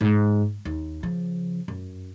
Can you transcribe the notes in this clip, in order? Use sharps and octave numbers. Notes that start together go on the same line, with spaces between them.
G#2
D#2
C#3 F3
F#2